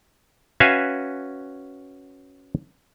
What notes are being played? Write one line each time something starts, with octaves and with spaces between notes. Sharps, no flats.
C#4 F#4 B4 E5 F5 G#5